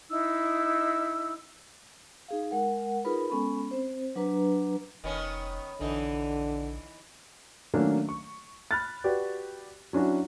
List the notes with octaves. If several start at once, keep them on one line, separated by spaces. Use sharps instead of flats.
D#4 E4 E6
D#4 G#4 F5
G#3 A#4 F#5
D#4 F4 G#4 A#4 B4 B5
G#3 B3 C#4 A4 B5
C4 C5
F#3 D4 B4 A#5
F1 D#3 B3 C#4
A#1 D3 E3 D#4
D#3 F#3 A3 A#3 C#4 D4
C#6
B5 F6 F#6 A6
F#4 G4 B4 D5
F#3 C#4 D4 E4 F#4